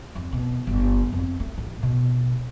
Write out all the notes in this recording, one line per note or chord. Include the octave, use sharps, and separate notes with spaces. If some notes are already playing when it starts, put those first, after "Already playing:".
F2
B2
G1
F2
A3
A1
B2